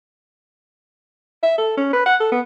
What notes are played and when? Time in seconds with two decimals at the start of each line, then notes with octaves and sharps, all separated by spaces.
1.43 E5
1.58 A4
1.77 C#4
1.93 B4
2.06 F#5
2.20 A4
2.32 B3